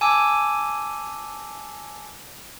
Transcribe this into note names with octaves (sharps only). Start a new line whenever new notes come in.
G#5 A5 D6 E6